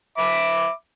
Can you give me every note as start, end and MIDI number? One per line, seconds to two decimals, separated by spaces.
0.18 0.71 76
0.18 0.71 83
0.18 0.71 86